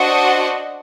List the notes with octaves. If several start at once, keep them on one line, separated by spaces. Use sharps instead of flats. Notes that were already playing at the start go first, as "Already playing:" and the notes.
Already playing: D4 F#4 C5 D#5 F#5